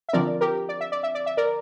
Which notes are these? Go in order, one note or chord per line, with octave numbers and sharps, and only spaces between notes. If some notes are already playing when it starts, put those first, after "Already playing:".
E5
D3 F3 C4 A#4 D5
G4 A#4
D5
E5
D5
E5
D5
E5
A#4 D5